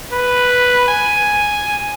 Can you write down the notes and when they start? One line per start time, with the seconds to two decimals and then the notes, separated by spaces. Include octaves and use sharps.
0.12 B4
0.88 G#5